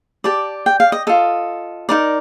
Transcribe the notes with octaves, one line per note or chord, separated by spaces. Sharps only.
G4 D5 A5
G5
F5
D#5
F4 A4 D#5
D#4 A#4 D5